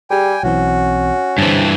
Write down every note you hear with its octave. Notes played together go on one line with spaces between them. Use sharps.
G3 G4 G#4 G5 G#5
B1 E3 C4 C#4 F#4
G2 D3 E3 C5 A5